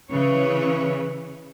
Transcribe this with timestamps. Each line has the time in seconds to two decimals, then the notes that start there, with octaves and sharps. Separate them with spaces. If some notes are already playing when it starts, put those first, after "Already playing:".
0.10 C#3 E3 B4 C#5